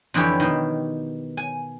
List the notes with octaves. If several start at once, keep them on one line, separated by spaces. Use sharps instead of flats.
F2 D3 E3 E4 G4 C#5
B2 D#3
G#5